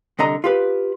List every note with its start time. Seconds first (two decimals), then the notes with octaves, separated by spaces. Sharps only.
0.19 C2 D3 D#5 A#5
0.44 F4 G4 B4